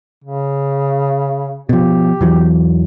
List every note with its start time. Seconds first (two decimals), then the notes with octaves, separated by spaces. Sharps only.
0.24 C#3
1.69 B2 F3 G4
2.21 E2 E3 F#3